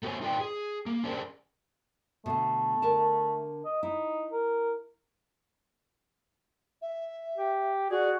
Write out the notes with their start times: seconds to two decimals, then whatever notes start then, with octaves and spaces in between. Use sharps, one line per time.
0.03 A3 B3 F#4 C5 C#5 G#5
0.21 D#4 F4 B4 D5 G5
0.40 G#4
0.86 A#3
1.04 C#4 D4 G#4 A#4 C5 D5
2.26 B2 D3 A3
2.82 D3 A#4 A5
3.65 D#5
3.83 D#4 E4
4.32 A#4
6.81 E5
7.37 G4
7.90 F#4 G#4 D5